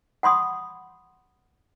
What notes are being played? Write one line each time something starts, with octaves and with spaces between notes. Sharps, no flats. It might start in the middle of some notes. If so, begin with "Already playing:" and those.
F#5 B5 C6 D#6